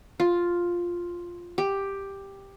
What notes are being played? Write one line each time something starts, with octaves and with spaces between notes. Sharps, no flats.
F4
G4